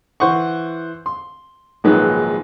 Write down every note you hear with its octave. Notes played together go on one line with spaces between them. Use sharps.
E3 C5 F#5 C#6
C6
A#1 G#2 D#3 F#3 G#3 B4